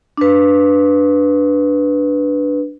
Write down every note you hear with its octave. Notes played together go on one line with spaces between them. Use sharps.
D4 B4